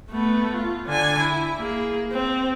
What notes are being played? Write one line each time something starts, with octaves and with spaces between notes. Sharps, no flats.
A3 B3
F4
D3 G#5
E4
A#3 G#4
C4